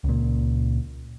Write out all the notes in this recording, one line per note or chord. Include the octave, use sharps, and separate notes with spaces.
C#2 A#2